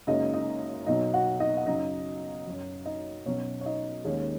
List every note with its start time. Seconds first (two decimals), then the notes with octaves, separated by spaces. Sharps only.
0.07 F#1 F#2 C#3 G#3 D#4 D#5
0.34 D#4 D#5
0.86 B1 B2 F#3 D#4 D#5
1.14 F#4 F#5
1.40 D#4 D#5
1.57 F#5
1.66 F#2 C#3 F#3 D#4 D#5
2.47 F#2 F#3
2.85 D#4 D#5
3.26 B1 B2 F#3 C#4 C#5
3.61 C#5
3.66 D#4 D#5
4.05 D#2 D#3 G#3 C#4 C#5